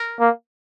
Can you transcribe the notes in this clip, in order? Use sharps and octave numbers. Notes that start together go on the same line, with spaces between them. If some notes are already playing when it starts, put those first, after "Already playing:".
Already playing: A#4
A#3